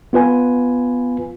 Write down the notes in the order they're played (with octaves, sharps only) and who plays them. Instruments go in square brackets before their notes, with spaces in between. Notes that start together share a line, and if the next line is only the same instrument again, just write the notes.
[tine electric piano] B3 F4 B4 G#5